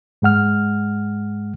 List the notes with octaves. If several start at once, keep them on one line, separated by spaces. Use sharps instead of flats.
G#2 G#3 F#5 F6